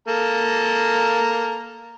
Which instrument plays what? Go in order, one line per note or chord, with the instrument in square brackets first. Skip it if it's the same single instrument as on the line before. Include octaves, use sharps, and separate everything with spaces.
[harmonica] A#3 A4 A#5